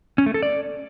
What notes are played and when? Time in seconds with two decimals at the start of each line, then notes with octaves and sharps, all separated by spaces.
0.18 C#4
0.26 A3
0.34 A4
0.43 D5